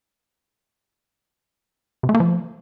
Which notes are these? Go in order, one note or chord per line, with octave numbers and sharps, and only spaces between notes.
C3
A3
A#3
F3